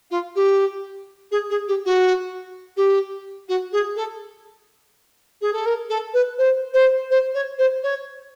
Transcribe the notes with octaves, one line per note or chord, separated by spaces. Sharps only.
F4
G4
G#4
G#4
G4
F#4
G4
F#4
G#4
A4
G#4
A4
A#4
A4
B4
C5
C5
C5
C#5
C5
C#5